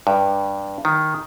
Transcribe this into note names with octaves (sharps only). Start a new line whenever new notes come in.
G2
D#3